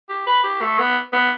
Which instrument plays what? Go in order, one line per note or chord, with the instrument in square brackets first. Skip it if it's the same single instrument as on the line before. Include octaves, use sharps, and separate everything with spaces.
[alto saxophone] G4
B4
G4
A3
B3
B3